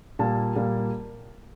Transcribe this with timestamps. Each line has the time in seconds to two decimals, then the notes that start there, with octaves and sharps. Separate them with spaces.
0.19 A#2 G3 A#3 A5
0.55 A#2 G3 A#3